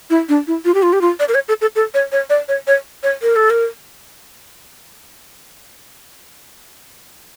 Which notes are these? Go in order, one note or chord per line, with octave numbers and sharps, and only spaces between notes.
E4
D4
E4
F4
G4
F4
G4
F4
D5
A#4
C#5
A4
A4
A4
C#5
C#5
D5
C#5
C#5
C#5
A#4
A4
A#4